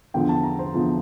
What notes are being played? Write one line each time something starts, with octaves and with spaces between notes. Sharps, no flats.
E2 D3 F3 G5
A5
A#5
C5
E2 D3 F3